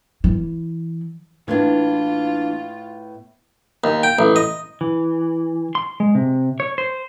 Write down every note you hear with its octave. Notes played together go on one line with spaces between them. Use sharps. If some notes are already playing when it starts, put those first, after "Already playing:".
E3
A2 E3 A#3 B3 D4 F4 G#6
D#2
G5
A1
D#5
E3
C6
G#3
C3
C#5
C5